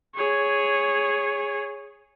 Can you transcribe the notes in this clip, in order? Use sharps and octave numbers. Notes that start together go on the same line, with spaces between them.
G#4 C#5